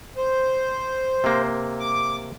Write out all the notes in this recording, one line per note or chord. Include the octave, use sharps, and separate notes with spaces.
C5
C3 A#3
D6